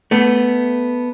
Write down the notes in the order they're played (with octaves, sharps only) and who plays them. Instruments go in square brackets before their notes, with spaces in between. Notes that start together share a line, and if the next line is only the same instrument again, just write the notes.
[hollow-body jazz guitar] A3 B3